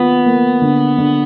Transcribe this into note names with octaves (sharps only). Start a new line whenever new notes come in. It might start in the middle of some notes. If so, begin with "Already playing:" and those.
Already playing: D#3 A#3 B3 F4
A#3
D3
D3